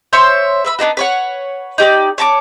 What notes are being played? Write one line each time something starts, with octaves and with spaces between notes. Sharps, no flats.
C5 C#5 E5 C6
B4 E5 B5
B3 D4 D#4 F#4
B4 C#5 F#5
D#4 G4 C#5 D5
C#5 A5 A#5 D6